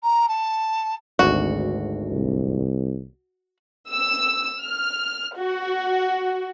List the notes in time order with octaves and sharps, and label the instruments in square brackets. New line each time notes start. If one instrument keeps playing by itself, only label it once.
[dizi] A#5
A5
[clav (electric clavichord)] G#1 D2 F#5 [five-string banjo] F#4
[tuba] C2
[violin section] E6
F6
F#4